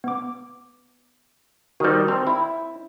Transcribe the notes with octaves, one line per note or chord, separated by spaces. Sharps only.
B3 D6
D#3 G3 F#4 C5
C4 A#5
E4